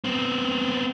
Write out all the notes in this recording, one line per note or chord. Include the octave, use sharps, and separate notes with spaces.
B3 C4